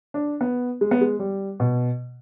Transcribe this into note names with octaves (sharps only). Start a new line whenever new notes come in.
D4
B3
G#3
B3
G#3
G3
B2